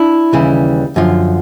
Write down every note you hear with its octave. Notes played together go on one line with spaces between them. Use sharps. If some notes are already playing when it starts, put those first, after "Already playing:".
Already playing: D4 E4
D#2 C#3 E3 G3
F#2 D3 F3